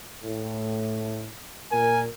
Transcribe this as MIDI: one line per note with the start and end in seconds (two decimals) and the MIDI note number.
0.23 1.27 45
1.71 2.06 46
1.71 2.06 70
1.71 2.01 80